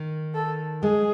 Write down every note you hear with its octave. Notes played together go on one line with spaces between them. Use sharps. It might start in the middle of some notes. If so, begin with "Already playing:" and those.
Already playing: D#3
A4
G#3 G#4